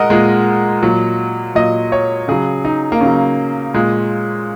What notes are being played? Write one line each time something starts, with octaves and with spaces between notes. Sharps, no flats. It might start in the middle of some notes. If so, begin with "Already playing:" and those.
Already playing: A#2 G#3 A#4 D#5 F#5
A#2 G#3
A#2 F#3
A#2 F#3 D#5
C#5
C#3 F#3 G#4
D#4
A#3
C#3 F#3 C#4
A#2 G#3